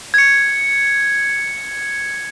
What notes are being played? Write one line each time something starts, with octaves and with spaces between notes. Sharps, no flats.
G#6 C#7